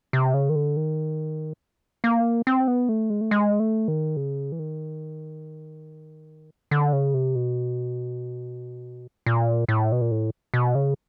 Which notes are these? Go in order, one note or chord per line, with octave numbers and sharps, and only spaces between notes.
C3
C#3
D#3
D3
D#3
A#3
C4
B3
A3
G#3
A3
G#3
A3
D#3
C#3
E3
D#3
D3
C#3
C3
B2
A#2
A2
B2
A#2
A2
B2
C#3